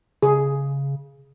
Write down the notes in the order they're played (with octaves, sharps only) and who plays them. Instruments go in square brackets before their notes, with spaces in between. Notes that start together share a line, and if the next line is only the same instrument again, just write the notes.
[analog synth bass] C#3 [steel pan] G#4